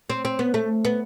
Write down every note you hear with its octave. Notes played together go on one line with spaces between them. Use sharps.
C4
C4
B3
A3
B3